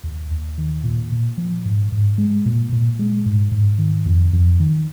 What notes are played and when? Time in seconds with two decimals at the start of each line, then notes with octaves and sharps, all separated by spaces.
0.03 D#2
0.31 D#2
0.58 D#3
0.84 A#2
1.12 A#2
1.38 F3
1.65 G#2
1.92 G#2
2.18 G#3
2.46 A#2
2.72 A#2
2.99 G#3
3.26 G#2
3.52 G#2
3.78 D#3
4.06 F2
4.33 F2
4.60 D#3